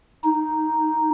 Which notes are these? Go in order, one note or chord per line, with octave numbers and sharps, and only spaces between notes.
D#4